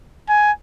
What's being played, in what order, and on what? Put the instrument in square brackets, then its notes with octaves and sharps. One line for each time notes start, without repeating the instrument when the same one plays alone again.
[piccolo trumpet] G#5